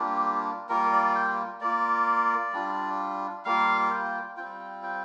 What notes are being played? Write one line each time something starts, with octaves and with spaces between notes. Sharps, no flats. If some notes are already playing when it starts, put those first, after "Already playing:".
Already playing: G3 A#3 D4 F4 G4
G3 A#3 F4 A#4
D5
G5
A#3 F4 D5
G3 D4 F4
G3 A#3 F4 F5
G5
G3 C4 F4 G5
G5